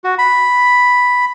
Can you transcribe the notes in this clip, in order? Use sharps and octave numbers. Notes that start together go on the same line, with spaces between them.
F#4
B5